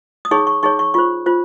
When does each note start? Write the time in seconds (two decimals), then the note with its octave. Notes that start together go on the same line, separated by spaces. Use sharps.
0.25 D#6
0.31 D#4 G#4 C#5 C#6
0.47 C#6
0.63 D#4 G#4 C#5 C#6
0.79 C#6
0.94 F4 C5 C#6
1.26 F4 C5